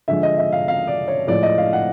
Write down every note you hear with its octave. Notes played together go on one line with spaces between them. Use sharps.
D3 F3 G#3 E5
D#5
E5
F5
F5
D5
C#5
A2 F3 G#3 D5
D#5
F5
F#5